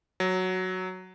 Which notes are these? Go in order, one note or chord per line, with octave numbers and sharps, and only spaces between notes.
F#3